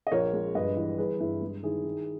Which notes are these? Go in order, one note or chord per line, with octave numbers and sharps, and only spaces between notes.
D#5
A#1 A#4 C#5
G#3
G2 B4 D#5
E3
G1 G#4 B4
G2 E4 G#4
G#3
D#3 E4 G#4
D#3